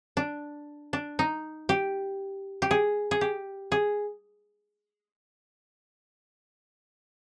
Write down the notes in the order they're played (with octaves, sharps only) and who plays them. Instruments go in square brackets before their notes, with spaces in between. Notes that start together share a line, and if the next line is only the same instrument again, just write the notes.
[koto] D4
D4
D#4
G4
G4
G#4
G#4
G4
G#4